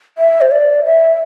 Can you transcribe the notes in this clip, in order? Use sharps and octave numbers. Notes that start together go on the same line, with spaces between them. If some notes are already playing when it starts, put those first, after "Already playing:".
E5
C5
D5
E5